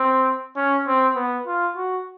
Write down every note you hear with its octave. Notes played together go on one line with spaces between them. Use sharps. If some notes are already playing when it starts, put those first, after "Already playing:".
Already playing: C4
C#4
C4
B3
F4
F#4